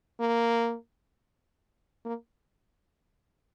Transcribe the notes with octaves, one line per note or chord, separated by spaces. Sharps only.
A#3
A#3